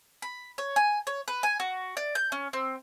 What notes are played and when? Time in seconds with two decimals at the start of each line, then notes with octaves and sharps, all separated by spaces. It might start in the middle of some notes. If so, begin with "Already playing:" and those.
0.22 B5
0.58 C#5
0.76 G#5
1.07 C#5
1.28 B4
1.43 G#5
1.60 F#4
1.97 D5
2.15 G6
2.32 C#4
2.53 C4